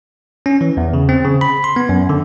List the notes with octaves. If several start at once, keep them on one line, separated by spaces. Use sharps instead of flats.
C#4
E3
E2
C#3
C4
C#3
B5
C6
B3
F#2
D3